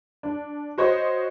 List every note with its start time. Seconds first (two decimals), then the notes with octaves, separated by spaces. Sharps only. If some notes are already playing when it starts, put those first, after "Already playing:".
0.23 D4
0.78 F#4 C5 C#5 D#5